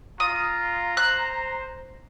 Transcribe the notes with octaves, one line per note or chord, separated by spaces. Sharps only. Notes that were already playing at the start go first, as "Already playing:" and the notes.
F4 A#5 D#6
C5 F#6